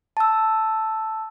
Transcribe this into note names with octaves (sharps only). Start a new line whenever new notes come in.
A5 E6